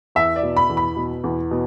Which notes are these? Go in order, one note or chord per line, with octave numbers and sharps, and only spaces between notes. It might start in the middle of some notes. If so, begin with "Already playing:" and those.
E2 E5
D5
B2
B5
E2
B5
B2
E2
B2